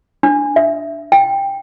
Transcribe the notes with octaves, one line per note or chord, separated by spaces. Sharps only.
D4
E5
G5